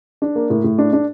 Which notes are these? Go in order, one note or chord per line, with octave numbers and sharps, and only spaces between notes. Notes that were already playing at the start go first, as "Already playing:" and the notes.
D4
A#3
A2
A2
D4
D4